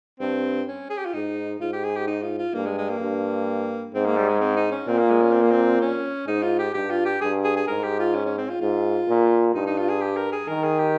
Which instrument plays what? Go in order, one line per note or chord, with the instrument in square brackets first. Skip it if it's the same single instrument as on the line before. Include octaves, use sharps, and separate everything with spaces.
[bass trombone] G2 [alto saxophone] C4
[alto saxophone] C#4
G#4
G4
F4
[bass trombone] G#2 [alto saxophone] D#4
[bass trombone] G#2 [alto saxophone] F4
[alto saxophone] G4
G#4
G4
D#4
F4
F4
[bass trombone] G2 [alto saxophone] A#3
[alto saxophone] G#3
G#3
A#3
[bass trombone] G2
[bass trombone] G#2 [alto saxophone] C4
[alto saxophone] A#3
G3
G#3
C4
D#4
C#4
[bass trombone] A#2 [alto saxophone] C4
[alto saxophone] A#3
G#3
C#4
C4
A#3
C4
C#4
[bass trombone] G#2 [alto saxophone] D#4
[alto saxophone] F4
G4
[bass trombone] G2 [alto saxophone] G4
[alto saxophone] F4
G4
[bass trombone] G2 [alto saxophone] G#4
[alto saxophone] G#4
G#4
[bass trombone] G#2 [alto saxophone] A#4
[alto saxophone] G4
F4
C#4
C#4
C4
F4
[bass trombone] G#2 [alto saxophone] F4
[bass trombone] A#2
[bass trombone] G2 [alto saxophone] D#4
[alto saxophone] D#4
F4
G#4
G4
A#4
G#4
[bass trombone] D#3 [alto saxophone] A#4
[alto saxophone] G#4
G4